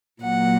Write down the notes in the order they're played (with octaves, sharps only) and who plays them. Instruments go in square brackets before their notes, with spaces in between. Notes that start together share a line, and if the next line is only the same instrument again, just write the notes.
[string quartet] A#2 F#3 A#3 F#5